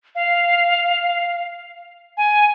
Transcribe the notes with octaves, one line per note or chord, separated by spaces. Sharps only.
F5
G#5